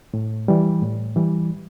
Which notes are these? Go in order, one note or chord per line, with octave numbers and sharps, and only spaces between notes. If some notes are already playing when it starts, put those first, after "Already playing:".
A2
E3 G3
A2
E3 G3